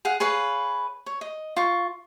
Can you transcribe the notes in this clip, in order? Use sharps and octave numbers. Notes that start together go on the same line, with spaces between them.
G#4 F5 F#5
G#4 B4 C#5 F5
C#5
D#5
F4 C#6